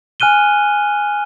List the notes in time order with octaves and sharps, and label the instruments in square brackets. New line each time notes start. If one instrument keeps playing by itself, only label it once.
[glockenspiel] G#5 F6 F#6 D#7 G7